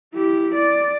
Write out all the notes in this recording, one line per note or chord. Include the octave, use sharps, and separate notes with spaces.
E4 G4
D5